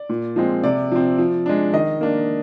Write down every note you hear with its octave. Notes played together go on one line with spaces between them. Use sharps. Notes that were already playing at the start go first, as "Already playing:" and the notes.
Already playing: D5
A#2
F3 G#3 C4
C3 D5
F3 C4
F3
G#3 D4
D#3 D#5
A#3 D4